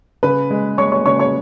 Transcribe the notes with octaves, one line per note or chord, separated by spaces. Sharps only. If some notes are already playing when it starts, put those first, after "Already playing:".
C#3 B4 B5
G#3
G#3 C#5 C#6
C#5 C#6
C#3 C#5 C#6
C#5 C#6